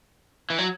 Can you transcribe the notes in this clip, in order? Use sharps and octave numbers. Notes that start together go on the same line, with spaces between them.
E3
F#3